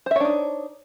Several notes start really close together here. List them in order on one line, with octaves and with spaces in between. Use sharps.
C5 E5 C#5 D4 D#4